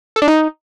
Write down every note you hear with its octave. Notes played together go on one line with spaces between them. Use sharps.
A4
D4
D#4